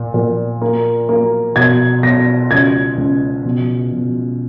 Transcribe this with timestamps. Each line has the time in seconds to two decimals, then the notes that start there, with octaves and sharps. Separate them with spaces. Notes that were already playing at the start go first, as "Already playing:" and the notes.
Already playing: A#2
0.14 A#2
0.62 A#3
1.09 A#3
1.56 B2 G#6
2.03 B2 A#6
2.51 C#2 G#6
2.98 C#2
3.45 B2
3.92 B2